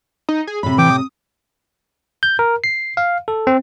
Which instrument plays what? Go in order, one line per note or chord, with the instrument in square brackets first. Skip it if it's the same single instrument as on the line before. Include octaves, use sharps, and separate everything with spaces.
[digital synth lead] D#4
G#4
[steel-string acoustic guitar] A2 C3 [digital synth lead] B5
[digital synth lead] E3 [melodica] G5 D6
[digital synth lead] D#6
[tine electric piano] G6
A#4
C7
F5
A4
C4